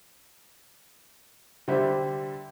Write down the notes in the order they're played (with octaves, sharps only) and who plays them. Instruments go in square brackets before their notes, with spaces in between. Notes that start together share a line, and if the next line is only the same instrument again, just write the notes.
[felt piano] D3 G3 [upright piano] G4 C5 E5